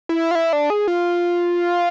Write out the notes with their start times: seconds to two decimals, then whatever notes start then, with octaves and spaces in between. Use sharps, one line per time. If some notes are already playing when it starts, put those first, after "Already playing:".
0.09 E4
0.31 F4
0.35 E4
0.53 D4
0.70 G#4
0.88 F4